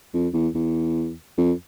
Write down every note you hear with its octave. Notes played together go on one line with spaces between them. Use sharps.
F2
E2
E2
F2